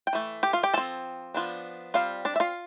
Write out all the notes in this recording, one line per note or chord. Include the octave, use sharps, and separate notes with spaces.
G5
E3 A3
G4 G5
F4 F5
G4 G5
F3 C4 A4 A5
F3 B3 D4
G3 C4 F4 F5
D4 D5
E5
F4 F5